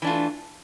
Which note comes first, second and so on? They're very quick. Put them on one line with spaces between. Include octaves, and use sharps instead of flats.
E3 D4 F4 A3